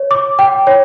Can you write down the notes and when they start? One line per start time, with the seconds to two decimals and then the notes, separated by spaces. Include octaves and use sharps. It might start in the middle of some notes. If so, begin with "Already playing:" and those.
Already playing: C#5
0.11 D6
0.39 G5
0.67 C#5